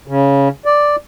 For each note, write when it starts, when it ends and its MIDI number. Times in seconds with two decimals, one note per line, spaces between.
0.08 0.49 49
0.65 0.96 74